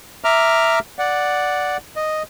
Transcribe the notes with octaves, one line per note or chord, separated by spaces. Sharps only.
E5 A#5 D6 F6
D5 F#5
D#5